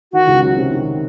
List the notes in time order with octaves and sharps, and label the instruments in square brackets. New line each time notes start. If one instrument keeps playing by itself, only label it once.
[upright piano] D#3 [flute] F#4
[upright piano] C#2
F#3
C3
D#3